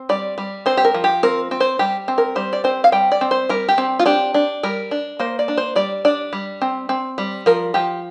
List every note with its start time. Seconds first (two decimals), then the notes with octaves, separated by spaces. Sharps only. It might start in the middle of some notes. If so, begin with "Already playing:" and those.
Already playing: C4
0.09 G3 D5
0.38 G3
0.66 C4 C5
0.77 G4
0.85 A#4
0.94 F3
1.04 G4
1.23 C4 A#4
1.51 C4
1.60 C5
1.79 G3 G4
2.08 C4
2.18 A#4
2.35 G3 C5
2.53 D5
2.64 C4 C5
2.84 F5
2.92 G3 G5
3.12 D5
3.21 C4
3.31 C5
3.49 G3 A#4
3.68 G4
3.78 C4
3.99 F4
4.06 D4 G4
4.34 D4
4.63 G3 A#4
4.91 D4
5.19 A#3 C5
5.39 D5
5.48 D4
5.57 C5
5.76 G3 D5
6.05 D4 D5
6.33 G3
6.62 C4
6.89 C4
7.18 G3
7.46 F3 A#4
7.74 F3 G4